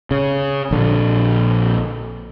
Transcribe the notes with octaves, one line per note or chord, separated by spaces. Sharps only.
C#3
A#1 D3